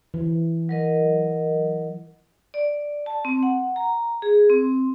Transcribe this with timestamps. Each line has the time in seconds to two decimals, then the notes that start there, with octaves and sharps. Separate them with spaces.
0.14 E3
0.69 F#3 A#4 D#5
2.54 D5
3.06 A5
3.25 C4
3.43 F#5
3.76 A#5
4.22 G#4
4.49 C4